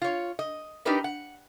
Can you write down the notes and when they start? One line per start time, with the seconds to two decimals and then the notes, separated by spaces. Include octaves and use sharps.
0.01 F4 C#5
0.39 D#5
0.85 D4 D#4 G4 A#4 B4 D5
1.04 F#5